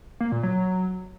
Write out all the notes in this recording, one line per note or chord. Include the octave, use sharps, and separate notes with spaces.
A#3
A#2
F#3